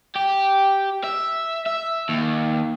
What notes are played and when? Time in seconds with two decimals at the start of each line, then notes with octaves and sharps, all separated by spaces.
0.16 G4
1.04 E5
1.66 E5
2.09 D#2